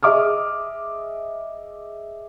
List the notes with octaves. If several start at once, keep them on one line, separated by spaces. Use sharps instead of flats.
G#4 D#5 E5 D6 D#6 F6